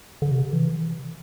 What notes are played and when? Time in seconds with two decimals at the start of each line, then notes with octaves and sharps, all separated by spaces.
0.22 D3
0.31 C3
0.53 E3